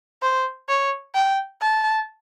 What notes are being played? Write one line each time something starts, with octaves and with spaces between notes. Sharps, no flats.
C5
C#5
G5
A5